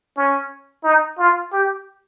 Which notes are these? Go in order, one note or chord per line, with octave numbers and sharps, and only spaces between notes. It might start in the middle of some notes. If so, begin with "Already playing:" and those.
C#4
D#4
F4
G4